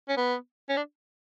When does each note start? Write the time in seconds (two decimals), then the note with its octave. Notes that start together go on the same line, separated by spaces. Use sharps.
0.08 C#4
0.17 B3
0.69 C#4
0.77 D4